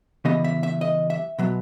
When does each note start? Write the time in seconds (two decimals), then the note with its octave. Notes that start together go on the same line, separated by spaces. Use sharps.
0.25 C#3 E3 G3 B3 D#5
0.44 E5
0.63 E5
0.81 D#5
1.10 E5
1.39 B2 F#3 B3